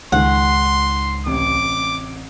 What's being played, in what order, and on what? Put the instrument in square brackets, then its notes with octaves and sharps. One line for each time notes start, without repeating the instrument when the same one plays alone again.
[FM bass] C#2 [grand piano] G#2 D#3 G#3 [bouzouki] F#5 [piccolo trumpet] C6
[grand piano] A1 C3 [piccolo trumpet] D6